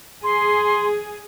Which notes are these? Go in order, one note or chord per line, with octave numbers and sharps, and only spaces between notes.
G#4 C6